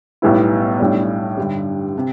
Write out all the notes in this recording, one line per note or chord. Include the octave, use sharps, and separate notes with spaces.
B1 A2 G3 B3 E4
B1 A2 G3 D4
G2 D3 G3
C3